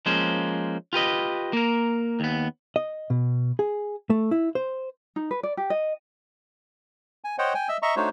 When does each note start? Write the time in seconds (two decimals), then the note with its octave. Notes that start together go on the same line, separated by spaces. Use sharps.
0.06 F3 G#3 A#3 C#4 C5
0.93 F4 G4 B4 D#5
1.53 A#3 A#4
2.20 D#2 B3
2.76 D#5
3.10 B2
3.59 G#4
4.10 A3
4.31 E4
4.55 C5
5.16 D#4
5.31 B4
5.43 D5
5.57 G4
5.70 D#5
7.24 G#5
7.38 C5 C#5 D#5 F#5 G5
7.54 G5 G#5
7.69 D#5 E5 E6
7.82 D#5 E5 A#5 C#6
7.96 A3 D4 D#4 F#4 C5 C#5